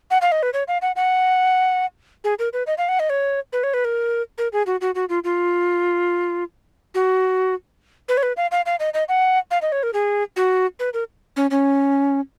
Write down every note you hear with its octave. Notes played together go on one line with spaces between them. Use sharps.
F#5
F5
D#5
B4
C#5
F5
F#5
F#5
G#4
A#4
B4
D#5
F5
F#5
D#5
C#5
B4
C#5
B4
A#4
A#4
G#4
F#4
F#4
F#4
F4
F4
F#4
B4
C#5
B4
F5
F5
F5
D#5
D#5
F#5
F5
D#5
C#5
A#4
G#4
F#4
B4
A#4
C#4
C#4